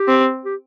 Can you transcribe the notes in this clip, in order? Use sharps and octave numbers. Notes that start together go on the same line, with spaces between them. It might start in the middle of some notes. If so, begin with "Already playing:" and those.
Already playing: G4
C4
G4